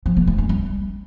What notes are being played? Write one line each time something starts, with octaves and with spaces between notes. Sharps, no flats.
F3
A#3
A3
C#4
G3